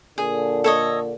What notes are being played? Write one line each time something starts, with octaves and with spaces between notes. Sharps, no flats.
A#2 D3 G#4
A4 C#5 D#5